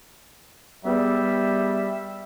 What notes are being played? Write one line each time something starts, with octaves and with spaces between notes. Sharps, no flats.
G3 B3 G#4 E5